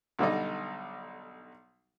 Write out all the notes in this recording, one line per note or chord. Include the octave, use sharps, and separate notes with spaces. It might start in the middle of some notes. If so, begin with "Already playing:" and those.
B1 D3 G3 D#4